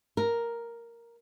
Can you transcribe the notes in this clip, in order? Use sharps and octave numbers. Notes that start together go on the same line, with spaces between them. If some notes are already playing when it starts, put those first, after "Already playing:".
A#4